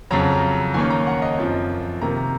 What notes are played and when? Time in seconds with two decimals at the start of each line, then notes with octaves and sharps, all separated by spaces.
0.11 F2 C#3 F#3 A#5
0.74 D#2 D#3 A#3 C#4 G#5
0.90 A#5
1.07 F#5
1.22 D#5
1.38 F#2 F3 C4
2.01 C3 D#3 A#3 A#5